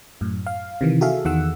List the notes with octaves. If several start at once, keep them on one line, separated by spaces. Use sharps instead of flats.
F#2 A2
F5
C3 D#3 E3
F#4 G#4 A4 E5 F5
E2 D#3 F#5 E6